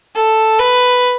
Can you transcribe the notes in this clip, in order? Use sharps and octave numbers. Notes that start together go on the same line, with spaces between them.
A4
B4